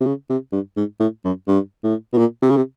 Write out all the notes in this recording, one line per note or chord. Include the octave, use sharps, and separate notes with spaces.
C3
C#3
C3
G2
G#2
A2
F#2
G2
A2
B2
A#2
C3
C#3
C3